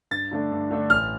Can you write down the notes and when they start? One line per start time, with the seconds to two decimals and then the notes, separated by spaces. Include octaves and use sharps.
0.11 G2 A6
0.31 D3 A3 D4
0.51 G2
0.71 D3 A3 D4
0.90 A1 F6